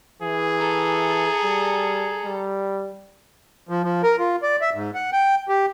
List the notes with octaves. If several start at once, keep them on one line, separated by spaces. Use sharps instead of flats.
E3 G#4
A4 A#5
G3
G3
F3
F3
A#4
F4
D5
E5
G#2
F#5
G5
G4